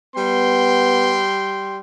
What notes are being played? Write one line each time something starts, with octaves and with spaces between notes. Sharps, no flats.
G3 B3 G5 C6